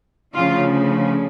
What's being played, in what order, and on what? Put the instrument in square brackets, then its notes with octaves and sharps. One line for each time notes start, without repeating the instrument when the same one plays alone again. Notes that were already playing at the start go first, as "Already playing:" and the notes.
[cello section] D2 C#3 F3 F4